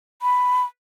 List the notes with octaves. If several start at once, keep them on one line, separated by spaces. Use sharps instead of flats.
B5